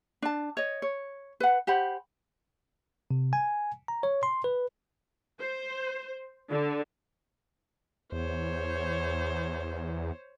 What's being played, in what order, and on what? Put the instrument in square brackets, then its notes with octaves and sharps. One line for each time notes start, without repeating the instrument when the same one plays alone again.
[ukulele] D4 A5
C#5 D#5
C#5
B4 F#5
G4 C5 F#5 B5
[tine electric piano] C3
G#5
A#5
C#5
C6
B4
[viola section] C5
D3
[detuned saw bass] E2 [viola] C5 C#5